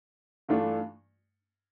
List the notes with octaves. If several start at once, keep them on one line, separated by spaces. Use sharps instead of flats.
G2 E3 A3 D4 F4